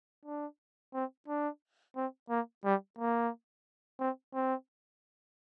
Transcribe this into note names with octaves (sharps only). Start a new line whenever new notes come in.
D4
C4
D4
C4
A#3
G3
A#3
C4
C4